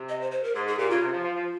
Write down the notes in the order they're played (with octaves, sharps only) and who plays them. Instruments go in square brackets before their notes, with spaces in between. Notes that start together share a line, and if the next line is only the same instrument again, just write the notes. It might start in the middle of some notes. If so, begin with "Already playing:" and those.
Already playing: [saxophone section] C3
[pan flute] D#5
C5
C5
A#4
[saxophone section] G#2 [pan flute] G#4
[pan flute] G#4
[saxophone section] A#2 [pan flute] G4
[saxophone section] C#3 [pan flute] F4
[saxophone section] C3
F3
F3
F3